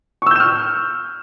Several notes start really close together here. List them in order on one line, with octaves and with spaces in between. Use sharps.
C#6 E6 G6 E7 F6